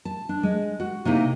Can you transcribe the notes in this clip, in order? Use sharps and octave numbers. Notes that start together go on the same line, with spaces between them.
A5
D4
G#3
F#4
C3 A#3 D#4 E4